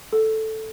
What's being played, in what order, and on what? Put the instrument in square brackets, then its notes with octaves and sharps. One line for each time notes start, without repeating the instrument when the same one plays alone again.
[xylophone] A4